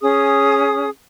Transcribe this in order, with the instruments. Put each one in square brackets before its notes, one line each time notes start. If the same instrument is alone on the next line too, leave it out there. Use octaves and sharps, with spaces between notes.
[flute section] C#4 G#4 D#6